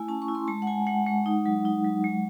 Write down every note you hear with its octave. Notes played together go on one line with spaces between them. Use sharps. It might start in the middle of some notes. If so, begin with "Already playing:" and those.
Already playing: A3 E4 G#5
C#4 A5
C#6
E4
C6
G#3 A5
F#5
G#3 G#5
G#3 F#5
G#3
D#4
F#3
D#4
F#3
G#3